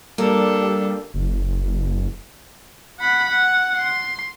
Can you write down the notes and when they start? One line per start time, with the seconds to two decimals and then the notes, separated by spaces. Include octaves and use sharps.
0.18 G3 A#3 D4 A4 A#4
1.14 F#1
3.00 F#5 B5
3.30 F#5
3.77 C6